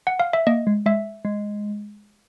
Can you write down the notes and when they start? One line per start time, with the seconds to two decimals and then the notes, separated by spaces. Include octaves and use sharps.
0.07 F#5
0.20 F5
0.33 E5
0.47 A#3 D#5
0.67 G#3
0.86 G#3 E5
1.25 G#3